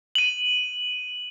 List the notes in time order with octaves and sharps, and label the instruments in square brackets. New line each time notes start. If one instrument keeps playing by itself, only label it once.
[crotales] D#7 F#7